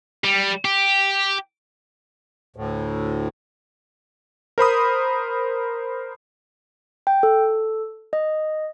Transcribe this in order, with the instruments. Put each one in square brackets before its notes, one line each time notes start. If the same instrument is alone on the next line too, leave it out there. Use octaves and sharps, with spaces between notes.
[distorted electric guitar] G3
G4
[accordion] D2 A2
[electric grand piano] A#4 C5 B5 D#6
[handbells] G5
A4
D#5